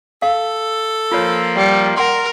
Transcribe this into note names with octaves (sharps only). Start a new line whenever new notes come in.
A4 F5
F3 A#3 F4 C#5
G3
A#4 F#5 C6